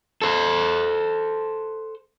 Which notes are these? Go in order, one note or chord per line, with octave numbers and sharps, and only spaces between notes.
A4 C5